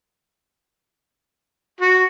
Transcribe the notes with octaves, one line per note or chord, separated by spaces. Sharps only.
F#4